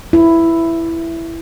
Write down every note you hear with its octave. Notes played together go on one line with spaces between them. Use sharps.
E4